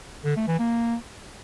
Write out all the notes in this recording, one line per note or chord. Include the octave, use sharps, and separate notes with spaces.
D3
A3
E3
A#3